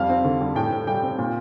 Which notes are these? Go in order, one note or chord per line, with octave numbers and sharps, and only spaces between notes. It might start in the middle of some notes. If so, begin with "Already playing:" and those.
Already playing: F2 G3 F5
C4
D3
G3
A2 G5
A2
G3 G5
C4
A#2